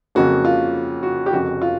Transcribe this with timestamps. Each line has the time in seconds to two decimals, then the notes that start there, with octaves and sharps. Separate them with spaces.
0.15 F2 C#3 F#3 A#3 F#4
0.45 F4
1.03 F#4
1.26 G4
1.33 F1 F2 C#3 F#4
1.62 F4